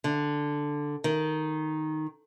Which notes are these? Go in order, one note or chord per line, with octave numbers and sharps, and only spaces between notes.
D3
D#3